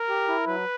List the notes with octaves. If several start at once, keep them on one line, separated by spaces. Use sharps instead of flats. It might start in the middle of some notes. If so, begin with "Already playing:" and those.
Already playing: A#4
G4
E4
F#3 B4